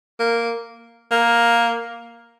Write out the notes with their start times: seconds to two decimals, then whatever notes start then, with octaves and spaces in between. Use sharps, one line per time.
0.19 A#3
1.11 A#3